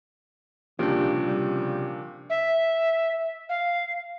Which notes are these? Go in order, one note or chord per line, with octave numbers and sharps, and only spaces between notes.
C2 A#2 C#3 F3 D4 G4
G3
E5
F5